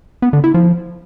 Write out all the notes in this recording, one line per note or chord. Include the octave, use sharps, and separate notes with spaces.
B3
D3
E4
F3